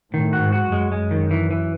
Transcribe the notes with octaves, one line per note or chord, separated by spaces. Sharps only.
A2 D#3
F#4
G#2
F#4
F#2 G#3
G#3
D#3
E3
E3